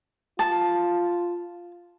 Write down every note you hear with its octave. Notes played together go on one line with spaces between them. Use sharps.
F4 A5